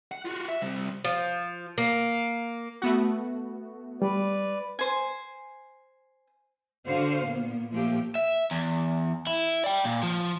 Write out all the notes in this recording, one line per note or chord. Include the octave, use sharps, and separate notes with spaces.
F#5
F4 F#4
E5
C3 G3
F3
A#3
A3 B3 F#4
G3 B4 D5
C5 G#5
D3 F#4 C5 F5
A#2 A#3 B3
A#2 F3 A3 A#3 G4
E5
E2
E4
D5 G5
A#2
F3